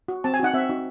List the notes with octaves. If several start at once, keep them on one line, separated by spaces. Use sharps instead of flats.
F#4
C4 A5
G#5
D#4 F#4 F#5
C4 E5
D#4 F#4